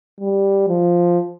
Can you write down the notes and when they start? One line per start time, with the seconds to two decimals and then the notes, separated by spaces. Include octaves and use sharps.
0.20 G3
0.68 F3